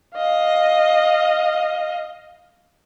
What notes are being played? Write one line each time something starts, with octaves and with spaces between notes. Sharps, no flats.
D#5 F5